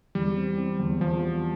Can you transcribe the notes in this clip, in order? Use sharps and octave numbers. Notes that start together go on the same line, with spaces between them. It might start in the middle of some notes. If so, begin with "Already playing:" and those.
E2 G3
C4
C4
E2
E2 F3
G3